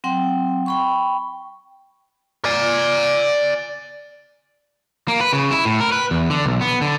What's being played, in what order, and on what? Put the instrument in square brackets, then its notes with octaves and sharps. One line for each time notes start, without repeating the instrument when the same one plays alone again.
[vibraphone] F#3 C4 F#5 G5 C6
G5 B5 C#6
[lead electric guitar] D5 G#5
[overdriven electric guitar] A#3
B4
C#3
E4
A2
A#4
B4
E2
D3
B1
B3
D3